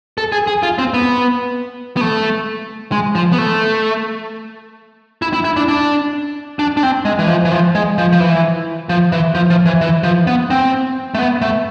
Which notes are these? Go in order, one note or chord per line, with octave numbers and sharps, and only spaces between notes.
A4
G#4
G#4
F4
C4
B3
B3
A3
G#3
F3
B3
A3
E4
E4
E4
D4
D4
D4
D4
C4
G#3
E3
F3
E3
F3
G#3
F3
F3
E3
F3
E3
F3
F3
E3
E3
F3
B3
C4
A3
B3
A3